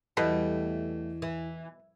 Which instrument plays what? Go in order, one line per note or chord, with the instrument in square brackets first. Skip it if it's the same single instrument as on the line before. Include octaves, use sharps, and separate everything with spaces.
[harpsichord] E2 [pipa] B2 [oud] G3 A3
[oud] E3